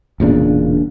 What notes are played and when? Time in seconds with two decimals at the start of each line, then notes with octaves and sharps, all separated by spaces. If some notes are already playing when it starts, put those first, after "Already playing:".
0.20 E1 A#2 C#3 D4